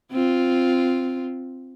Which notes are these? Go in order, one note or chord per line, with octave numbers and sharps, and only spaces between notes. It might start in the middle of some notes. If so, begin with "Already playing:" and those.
C4 F4